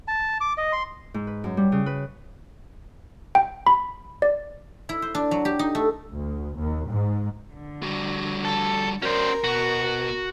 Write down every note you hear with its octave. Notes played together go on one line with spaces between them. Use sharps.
A5
D6
D#5
C6
G#2
B4
F#2
G3
C#3
B4
G5
B5
D5
E4
C5
D4
F#3
G4
D#4
A3
D2
D#2
G#2
D3
G3 F#4
A4
C#4 F#4 A#4 C5 D5
B2 F#4